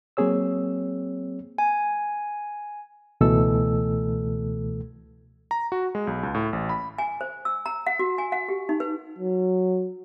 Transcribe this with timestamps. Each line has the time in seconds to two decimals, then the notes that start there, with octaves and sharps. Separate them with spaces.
0.17 F#3 A#3 C4 G#4 C#5 E6
1.58 G#5
3.21 C#2 B2 E3 A3 A4 E6
5.51 A#5
5.72 F#4
5.95 G#3
6.07 B1
6.23 C#2
6.35 A2
6.53 A1
6.69 B5
6.98 G#5
7.21 C5
7.45 E6
7.66 A#5
7.87 F#5
7.99 F#4
8.18 G#5
8.32 F#5
8.49 G4
8.69 D#4
8.80 B4
9.19 F#3